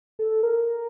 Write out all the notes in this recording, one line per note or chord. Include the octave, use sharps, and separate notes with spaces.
A4
A#4